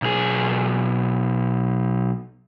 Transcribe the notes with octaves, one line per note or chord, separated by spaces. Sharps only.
B1 G#4